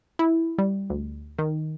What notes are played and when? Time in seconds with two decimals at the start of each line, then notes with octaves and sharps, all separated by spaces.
0.19 E4
0.59 G3
0.90 D2
1.38 D#3